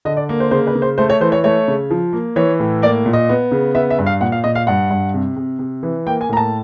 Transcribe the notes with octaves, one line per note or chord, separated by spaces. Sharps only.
D3 D#5
D5
A#3
C5
C#3 C5
B4
C#3
C5
A3 C5
C#5
E3 C5
C#5
A3 C#5
C#3
F3
A#3
E3 C#5
A2
A#3 D5
A#2
D#5
B3
C#3
B3 E5
E5
G2
F5
A#2 F#5
F5
A#2 D#5
F5
G2 F#5
G2
C3
C3
C3
E3
A#3 G5
G#5
A2 A#5
A5